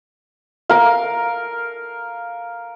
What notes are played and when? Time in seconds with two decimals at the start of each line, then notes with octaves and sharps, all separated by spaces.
0.70 A#4 F5